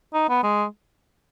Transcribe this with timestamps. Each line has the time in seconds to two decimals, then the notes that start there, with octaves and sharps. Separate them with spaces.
0.14 D#4
0.29 B3
0.43 G#3